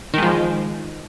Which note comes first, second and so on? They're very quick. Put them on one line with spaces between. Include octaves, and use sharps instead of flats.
D#3 G#3 F3